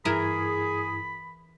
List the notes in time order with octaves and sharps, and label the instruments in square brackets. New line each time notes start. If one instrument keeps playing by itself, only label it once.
[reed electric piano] G2 E4 G#6 [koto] E3 A#4 [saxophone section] G#4 [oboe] B5